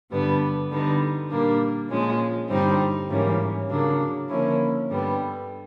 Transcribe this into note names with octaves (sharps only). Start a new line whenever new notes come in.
G2 D3 G3 B3 D4
D3 G3 B3 D#4
A#2 G3 A#3 D4
A#2 F3 G#3 C#4
G2 D3 G3 C4 D#4
G#2 E3 G3 A#3 C#4
C#3 F#3 A#3 D4
D3 F3 A#3 C#4 E4
G2 D3 G3 B3